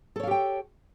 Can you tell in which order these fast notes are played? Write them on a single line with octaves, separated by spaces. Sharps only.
A4 C#5 F5 G4 G5